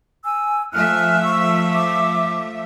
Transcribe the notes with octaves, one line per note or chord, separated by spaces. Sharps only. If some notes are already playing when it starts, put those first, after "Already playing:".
G#5 E6
F3 A3 E5 G#5 F6 F#6
C#6 E6
D6